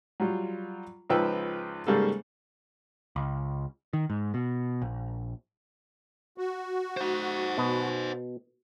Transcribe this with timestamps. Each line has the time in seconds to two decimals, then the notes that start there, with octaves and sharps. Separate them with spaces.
0.20 F#3 G3 F4
1.10 C#2 F3 D#4 B4 G5 E6
1.87 G#2 C#3 G3 A#3 A4
3.16 C#2
3.93 D#3
4.10 G#2
4.34 B2
4.82 A#1
6.38 F#4
6.97 C5 F#5
7.58 B2